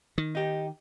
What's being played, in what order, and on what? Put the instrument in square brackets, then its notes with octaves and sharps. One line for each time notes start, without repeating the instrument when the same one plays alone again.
[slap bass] D#3
[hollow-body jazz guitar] D#4 G4